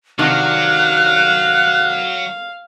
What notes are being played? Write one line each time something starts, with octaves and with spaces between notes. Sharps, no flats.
C3 D#3 F#3 D4 F5 F#6